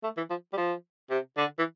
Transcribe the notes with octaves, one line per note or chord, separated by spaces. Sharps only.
A3
E3
F3
G3
F3
C3
D3
E3